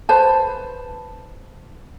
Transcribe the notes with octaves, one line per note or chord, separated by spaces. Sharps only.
B4 C5 A5